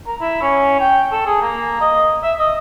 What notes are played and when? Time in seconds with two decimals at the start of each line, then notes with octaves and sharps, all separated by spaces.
0.06 A#4
0.21 E4
0.42 C#4
0.80 G5
1.12 A4
1.26 G#4
1.41 A#3
1.81 D#5
2.23 E5
2.39 D#5